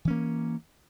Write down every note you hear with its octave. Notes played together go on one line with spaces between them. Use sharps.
E3 A#3 C#4